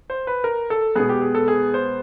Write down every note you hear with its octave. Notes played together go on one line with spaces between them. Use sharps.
C5
B4
A#4
A4
B2 G#3 B3 G#4
G4
G#4
A4
G#4
C5